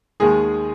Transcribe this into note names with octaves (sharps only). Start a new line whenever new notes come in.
D#2 D#3 G#3 G#4